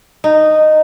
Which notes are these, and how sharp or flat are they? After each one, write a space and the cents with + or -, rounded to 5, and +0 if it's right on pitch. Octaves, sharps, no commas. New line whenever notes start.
D#4 -10